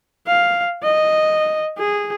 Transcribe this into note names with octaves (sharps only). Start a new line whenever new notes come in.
F5
D#5
G#4